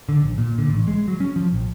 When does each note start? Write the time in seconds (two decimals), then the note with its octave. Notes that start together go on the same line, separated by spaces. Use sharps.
0.09 D3
0.22 A#1
0.38 A#2
0.58 D3
0.69 A1
0.88 G#3
1.08 F#3
1.20 C#4
1.36 F3
1.52 A#1